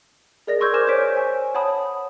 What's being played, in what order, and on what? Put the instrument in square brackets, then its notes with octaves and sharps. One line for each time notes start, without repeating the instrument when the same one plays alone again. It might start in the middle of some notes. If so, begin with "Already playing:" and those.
[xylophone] G#4 A#4 D5 D#5 A#6
C6 C#6 E6 G6 G#6
A#4 C5 G#5 D6 F6 E7
C5 C#5 C#6 G6 B6 D7
G#5
C#5 F#5 A5 B5 D#6